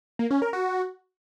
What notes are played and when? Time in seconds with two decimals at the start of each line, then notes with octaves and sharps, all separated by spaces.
0.19 A#3
0.31 C#4
0.42 A#4
0.53 F#4